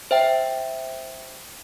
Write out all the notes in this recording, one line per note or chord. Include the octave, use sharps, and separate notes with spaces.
C5 E5 G5